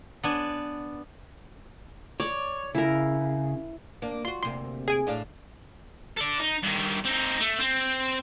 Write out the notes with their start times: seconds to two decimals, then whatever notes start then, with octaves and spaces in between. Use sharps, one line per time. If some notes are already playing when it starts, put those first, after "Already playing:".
0.23 B3 D4 G#5
2.20 C#5 D5
2.75 C#3 E4 A#4
4.02 A#3 D4
4.25 F4 F#4 C6
4.43 D2 C3 A#3 C6
4.88 G#4 G#5 D7
5.07 A2 D4 F5
6.17 A4 D5
6.40 D#4
6.63 G2 D#3
7.05 C4 D#4
7.40 A3
7.60 C4